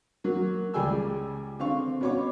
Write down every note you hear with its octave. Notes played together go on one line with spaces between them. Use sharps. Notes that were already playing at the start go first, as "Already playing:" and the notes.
F#3 A#3
C#2 G3 G#4 G5 G#5 E6
D3 C4 F5 C#6
B2 C#4 C#5 C#6 D6